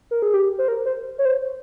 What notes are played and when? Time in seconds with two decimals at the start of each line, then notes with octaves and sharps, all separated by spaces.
0.11 A#4
0.22 G#4
0.34 G4
0.58 C5
0.68 A#4
0.86 C5
1.18 C#5
1.25 C5